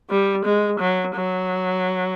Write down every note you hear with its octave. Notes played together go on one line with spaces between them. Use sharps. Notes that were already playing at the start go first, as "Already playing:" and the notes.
G3
G#3
F#3
F#3